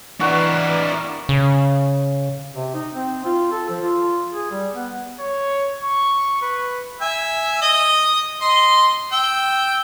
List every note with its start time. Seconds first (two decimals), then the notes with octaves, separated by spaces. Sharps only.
0.20 E3 G3 D4 E4 A#4 D5 F#5 C#6
1.29 C#3
2.55 C3
2.74 D#4
2.94 C4
3.25 F4
3.52 A4
3.70 F3
3.82 F4
4.32 G#4
4.51 G3
4.74 B3
5.20 C#5
5.82 C#6
6.42 B4
7.01 E5 G#5
7.62 D#5 D#6
8.41 D#5 C6
9.12 G5 E6